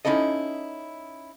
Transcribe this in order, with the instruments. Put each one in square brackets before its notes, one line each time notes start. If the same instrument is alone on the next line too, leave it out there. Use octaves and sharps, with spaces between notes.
[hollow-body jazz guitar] C#4 D#4 E4 A4 D#5